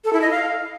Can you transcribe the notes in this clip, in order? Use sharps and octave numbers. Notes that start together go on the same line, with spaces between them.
A4
E4
D#5
F5